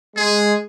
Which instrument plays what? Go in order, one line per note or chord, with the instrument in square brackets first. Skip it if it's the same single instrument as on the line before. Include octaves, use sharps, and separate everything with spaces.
[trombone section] G#3 [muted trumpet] G#4